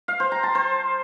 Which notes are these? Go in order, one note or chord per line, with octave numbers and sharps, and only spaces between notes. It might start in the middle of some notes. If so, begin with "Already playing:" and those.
F5
C5
A#5
A5
C5